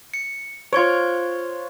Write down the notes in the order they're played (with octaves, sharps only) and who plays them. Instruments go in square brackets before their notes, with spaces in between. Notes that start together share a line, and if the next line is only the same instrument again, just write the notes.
[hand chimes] C#7
[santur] F4 C#5 [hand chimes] C5 C#6 G#6